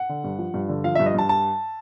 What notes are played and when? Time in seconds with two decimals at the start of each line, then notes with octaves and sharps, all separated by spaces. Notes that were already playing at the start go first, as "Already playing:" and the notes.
Already playing: F#5
0.09 D3
0.24 G2
0.39 F3
0.54 G2
0.69 D3
0.84 F3 F5
0.95 E5
1.00 G2
1.06 D#5
1.14 G2 A5
1.29 A5